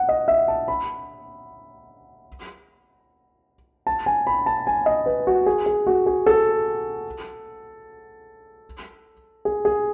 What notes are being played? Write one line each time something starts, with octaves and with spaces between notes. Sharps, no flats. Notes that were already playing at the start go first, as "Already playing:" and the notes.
Already playing: F#5
D#5
E5
A5
B5
A5
G#5
B5
A5
G#5
D#5
B4
F#4
G#4
G#4
F#4
G#4
A4
G#4
G#4